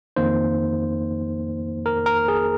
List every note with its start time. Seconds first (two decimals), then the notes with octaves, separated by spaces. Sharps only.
0.16 F2 D#3 A#3 D#4 C5
1.86 A#4
2.06 A#4
2.28 G#4